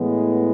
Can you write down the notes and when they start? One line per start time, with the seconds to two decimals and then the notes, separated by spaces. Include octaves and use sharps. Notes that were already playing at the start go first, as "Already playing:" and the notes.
Already playing: A2 E3 G#3 B3